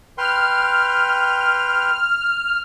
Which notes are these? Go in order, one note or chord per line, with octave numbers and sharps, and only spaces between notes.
B4 G5 C6 F6